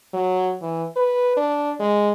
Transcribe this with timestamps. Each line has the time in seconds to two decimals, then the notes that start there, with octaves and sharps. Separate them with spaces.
0.14 F#3
0.62 E3
0.96 B4
1.37 D4
1.80 G#3